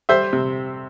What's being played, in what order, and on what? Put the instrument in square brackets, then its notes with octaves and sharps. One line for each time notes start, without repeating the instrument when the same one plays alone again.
[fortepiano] G3 C5 E5
C3